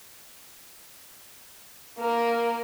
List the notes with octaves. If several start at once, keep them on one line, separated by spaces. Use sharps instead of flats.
A#3 A#4